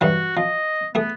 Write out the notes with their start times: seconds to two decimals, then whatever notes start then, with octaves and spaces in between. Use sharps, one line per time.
0.01 G2 E3 F#3 F#4
0.37 F3 D#5
0.95 A3 B3 G#4